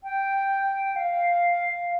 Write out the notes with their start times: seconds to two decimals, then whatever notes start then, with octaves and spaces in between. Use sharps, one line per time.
0.04 G5
0.96 F5